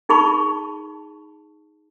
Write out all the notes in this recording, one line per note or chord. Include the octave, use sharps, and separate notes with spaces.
D#4 G#4 A5 B5 C#6